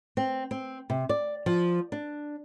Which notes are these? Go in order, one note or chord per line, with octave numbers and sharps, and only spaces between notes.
C4
C4
C3
D5
F3
D4